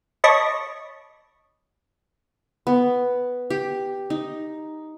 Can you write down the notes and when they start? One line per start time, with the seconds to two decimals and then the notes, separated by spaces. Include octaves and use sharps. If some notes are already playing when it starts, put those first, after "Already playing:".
0.24 C#5 D#5 A5 B5 C#6 D6
2.67 B3
3.50 G4
4.10 D#4